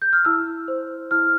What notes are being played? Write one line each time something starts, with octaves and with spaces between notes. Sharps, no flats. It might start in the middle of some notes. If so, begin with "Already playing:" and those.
G6
F6
E4 E6
C5
E4 F6